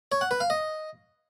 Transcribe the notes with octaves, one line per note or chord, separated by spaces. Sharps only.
C#5
F#5
B4
F5
D#5